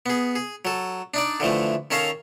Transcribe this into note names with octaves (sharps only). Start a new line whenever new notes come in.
B3 G#4
G#4
F#3 A4
D4 D#4 D5
D3 E3 F3 A3
D#3 C#4 A4 C#5 F5 A#5